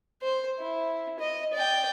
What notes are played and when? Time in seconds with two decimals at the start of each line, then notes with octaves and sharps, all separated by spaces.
0.22 C5
0.59 E4
1.19 D#5
1.54 D5 G5